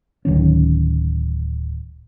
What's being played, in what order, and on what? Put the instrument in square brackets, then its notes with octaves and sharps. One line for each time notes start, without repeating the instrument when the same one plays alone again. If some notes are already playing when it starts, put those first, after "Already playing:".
[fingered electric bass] D1 D#3 C#4